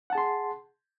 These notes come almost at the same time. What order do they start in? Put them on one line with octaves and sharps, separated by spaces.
F#5 A5 G#4 C6